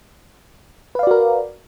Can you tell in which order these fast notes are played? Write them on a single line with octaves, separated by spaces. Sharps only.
B4 F5 D5 F#4 A#4